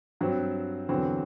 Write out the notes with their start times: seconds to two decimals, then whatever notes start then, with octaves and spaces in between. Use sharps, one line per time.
0.21 G2 F#3 C4
0.89 E2 D3 F#3 C4